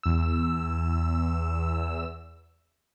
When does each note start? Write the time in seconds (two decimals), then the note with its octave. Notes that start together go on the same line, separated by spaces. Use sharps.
0.03 E2 E6